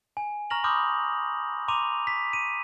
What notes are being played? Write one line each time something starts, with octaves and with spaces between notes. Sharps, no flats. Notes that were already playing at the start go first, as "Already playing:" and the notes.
G#5
A#5 C#6 F6 A#6 F7 F#7
B5 C6 D6 D#6 F6 G6
A#5 C6 D6 D#7 F7
B6
D#7